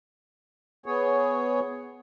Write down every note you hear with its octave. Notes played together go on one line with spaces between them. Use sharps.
B3 G#4 C#5